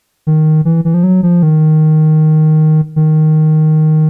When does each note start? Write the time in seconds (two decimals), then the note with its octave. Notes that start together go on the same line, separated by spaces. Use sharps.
0.27 D#3
0.65 E3
0.85 E3
0.94 F3
1.04 F#3
1.23 F3
1.43 D#3
2.96 D#3